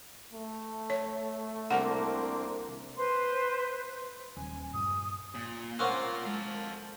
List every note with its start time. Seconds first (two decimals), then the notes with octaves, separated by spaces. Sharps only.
0.33 A3
0.90 C#5
1.71 C2 A#3 C4 D4 A#4 F#5 A#5
2.97 B4 C5 C6
4.37 D#1 G#5
4.73 G2 A#2 D#6
5.35 A#2
5.79 A#3 C4 C#4 F4 A#4 F#5 C#6 F#6
6.25 G#3 A4 F5